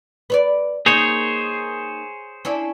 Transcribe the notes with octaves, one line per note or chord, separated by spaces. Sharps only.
B4 C#5 D5
A#3 D#4 G#4 C5 C#5
C#4 D4 E4